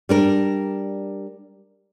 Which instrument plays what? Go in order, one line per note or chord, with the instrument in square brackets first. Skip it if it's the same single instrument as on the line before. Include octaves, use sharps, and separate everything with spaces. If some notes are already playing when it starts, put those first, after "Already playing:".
[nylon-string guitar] G3 D4 A#4